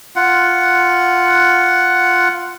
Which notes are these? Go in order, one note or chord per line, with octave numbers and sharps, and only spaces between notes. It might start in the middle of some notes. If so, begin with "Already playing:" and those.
F4 F#5